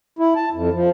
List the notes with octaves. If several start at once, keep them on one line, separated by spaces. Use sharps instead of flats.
E4
A5
F2
F3